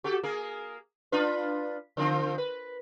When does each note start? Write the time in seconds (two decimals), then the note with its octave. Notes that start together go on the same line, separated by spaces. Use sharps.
0.04 F#4 G4 A4
0.23 A#3 G#4 A#4
1.12 D4 F4 B4
1.97 D3 F3 C4
2.38 B4